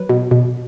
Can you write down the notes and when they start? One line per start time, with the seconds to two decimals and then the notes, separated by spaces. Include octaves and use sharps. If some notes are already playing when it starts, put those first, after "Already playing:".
Already playing: F#3 B4
0.09 B2
0.31 B2